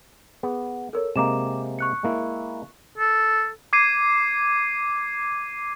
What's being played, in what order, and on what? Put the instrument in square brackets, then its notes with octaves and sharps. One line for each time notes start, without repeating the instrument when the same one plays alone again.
[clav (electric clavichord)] B3 [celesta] G#4
[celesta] A4 A#4 C#5
[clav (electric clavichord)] C3 G#3 A#3 [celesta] A#5 D6 E7
[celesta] C#6 F#6 C#7
[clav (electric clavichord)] G#3 A#3 E4
[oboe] A4
[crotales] D6 G#6 C7 D#7